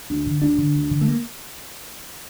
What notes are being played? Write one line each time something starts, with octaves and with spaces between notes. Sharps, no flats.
D2 D4
D3
D2 D4
D3
D2
D3
A3
A#3